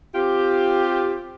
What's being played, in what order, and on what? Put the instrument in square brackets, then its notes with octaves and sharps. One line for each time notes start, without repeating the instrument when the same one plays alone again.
[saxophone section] C4 F4 G4